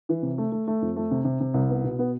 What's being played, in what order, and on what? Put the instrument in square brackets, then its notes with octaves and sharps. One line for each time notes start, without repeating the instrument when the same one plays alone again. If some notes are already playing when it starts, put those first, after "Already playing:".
[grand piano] E3
C3
A3
A3
A3
F2
A3
C3
C3
C3
C2
B3
B2
B3